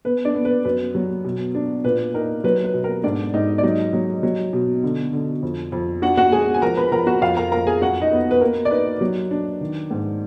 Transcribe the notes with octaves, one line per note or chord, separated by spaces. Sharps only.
B3 B4
D4 D5
B3
B4
F#2 B4
F#3
B2
D4
A#2 B4
D#4 A#4
F#3 B4
B4
B2
A#4
G#2 D4 D5
G#2 D#4 D#5
D5
F#3 D#4 D#5
F#3
F#3
B2
D3
D3
F2
F2
D4 F#4 F#5
F#4 F#5
G#3 G#4 G#5
G#5
F3 A#4 A#5
B4 B5
F3 A#4 A#5
F#4 F#5
F2 F4 F5
A#4 A#5
F2 A#4 A#5
G#4 G#5
F#2 F#4 F#5
D#4 D#5
B3
B4
A#3 A#4
D5
D#4 B4
F#3
D4
D#3
G#2